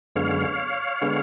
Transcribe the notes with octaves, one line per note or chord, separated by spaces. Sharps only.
F#2 D3 G#3 B3 C#5 F5
D3 G#3 B3